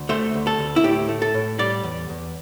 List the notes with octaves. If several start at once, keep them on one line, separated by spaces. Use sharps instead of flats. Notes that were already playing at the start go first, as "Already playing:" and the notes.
Already playing: D2
A3 C5
D2
A4
D2
E4
A2 G4
A3
A4
A2
G3 D5
E2
E2